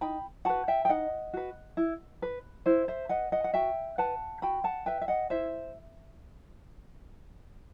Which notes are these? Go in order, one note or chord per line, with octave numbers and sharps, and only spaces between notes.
D#4 G5 B5
F#4 B4 F#5 A5
E5 G5
G5
D#4 D#5 F#5
F#4 B4
E4
B4
E4 C5 E5
C5 E5
B4 D#5 F#5
D#5 F#5
F#5
F#4 E5 G5
B4 F#5 A5
F#4 G5 B5
F#5 A5
B4 E5 G5
E5
D#5 F#5
E4 C5 E5